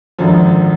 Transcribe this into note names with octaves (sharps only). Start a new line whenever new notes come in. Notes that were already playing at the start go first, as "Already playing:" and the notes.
G#1 F#2 D3 F3